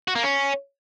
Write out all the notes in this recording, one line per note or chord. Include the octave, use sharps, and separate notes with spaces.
F#4
A#3
C#4